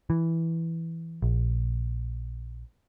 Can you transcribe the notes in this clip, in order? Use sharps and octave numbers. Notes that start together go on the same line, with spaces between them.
E3
A#1